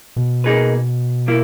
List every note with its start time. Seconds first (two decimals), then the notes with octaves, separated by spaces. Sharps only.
0.16 B2
0.44 A#3 D#4 G#4 B4
1.28 A#3 E4